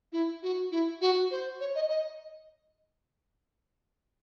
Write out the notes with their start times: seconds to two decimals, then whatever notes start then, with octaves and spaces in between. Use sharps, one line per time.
0.13 E4
0.43 F#4
0.72 E4
1.01 F#4
1.31 C5
1.60 C#5
1.75 D#5
1.90 D#5